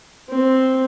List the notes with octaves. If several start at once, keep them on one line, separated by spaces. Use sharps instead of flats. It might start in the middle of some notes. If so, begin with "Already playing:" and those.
C4